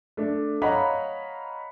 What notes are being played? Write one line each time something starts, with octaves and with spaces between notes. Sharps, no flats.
A3 D4
C#5 D#5 F5 F#5 A#5 B5